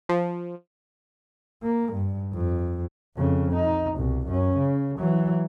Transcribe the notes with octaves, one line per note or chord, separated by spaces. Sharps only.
F3
A#3
G2
F2
F2 C#3
D#4
C2 B2
F#2 C#4
C#3
E3 F#3